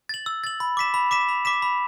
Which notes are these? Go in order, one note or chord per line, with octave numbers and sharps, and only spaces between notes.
A6 F#7
E6
A6 F#7
B5
D6 B6 E7
B5
D6 B6 E7
B5
D6 B6 E7
B5